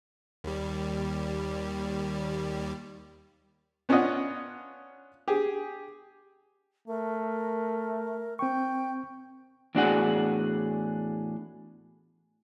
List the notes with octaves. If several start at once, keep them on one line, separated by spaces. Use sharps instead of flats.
D#2 G3
B3 C#4 D4 F4 D#5 F#5
G4 G#4
A3 A#4
C4 G5 C#6
E2 A2 D4 F#4 G#4 F#5